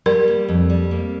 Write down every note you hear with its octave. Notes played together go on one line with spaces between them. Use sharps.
G3 A#4
A#3
F2
G3
A#3